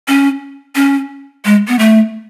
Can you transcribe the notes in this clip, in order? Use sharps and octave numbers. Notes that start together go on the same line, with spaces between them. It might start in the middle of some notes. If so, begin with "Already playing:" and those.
C#4
C#4
G#3
B3
A3